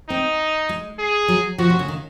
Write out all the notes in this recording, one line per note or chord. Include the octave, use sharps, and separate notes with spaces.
C4 D#4
G#3
G#4
F#3
F3 F#4
C3
C#3
D#3